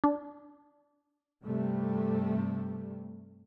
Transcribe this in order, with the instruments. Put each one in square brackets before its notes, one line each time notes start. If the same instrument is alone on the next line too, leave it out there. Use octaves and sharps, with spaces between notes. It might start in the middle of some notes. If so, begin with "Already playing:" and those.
[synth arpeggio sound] D4
[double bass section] G2 C3 G3 A3